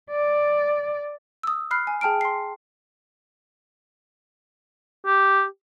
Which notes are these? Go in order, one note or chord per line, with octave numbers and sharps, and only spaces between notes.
D5
D#6 E6
B5 F6 F#6 C7
G#5
G#4 G5 A5 F6 D7
C6 C7
G4